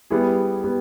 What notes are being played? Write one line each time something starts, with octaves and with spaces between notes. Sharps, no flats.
G3 B3 E4 G#4
G3 B3